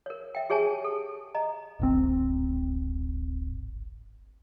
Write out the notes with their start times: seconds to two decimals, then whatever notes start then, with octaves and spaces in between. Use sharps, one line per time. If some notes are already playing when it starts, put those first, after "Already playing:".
0.06 A#4 C#5
0.35 E5 G5
0.50 G4 G#4 C#5 G#5 A5
0.84 A4
1.35 D#5 A#5
1.80 D1 G#1 C4